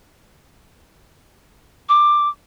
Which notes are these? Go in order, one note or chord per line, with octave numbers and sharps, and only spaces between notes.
D6